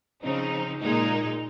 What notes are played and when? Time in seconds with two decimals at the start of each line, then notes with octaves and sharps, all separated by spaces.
0.23 C#3 F3 C4 D#4
0.81 A#2 G#3 D#4